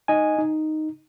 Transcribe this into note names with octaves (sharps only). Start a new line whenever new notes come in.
D#4 D#5 G#5
D#4